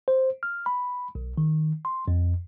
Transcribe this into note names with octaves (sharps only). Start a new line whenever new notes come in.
C5
F6
B5
B1
D#3
C6
F2